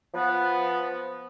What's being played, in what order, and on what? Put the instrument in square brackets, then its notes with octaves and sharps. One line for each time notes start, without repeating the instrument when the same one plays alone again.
[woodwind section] F3 B3